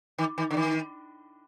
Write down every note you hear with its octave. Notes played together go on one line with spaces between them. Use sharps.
D#3
D#3
D3
D#3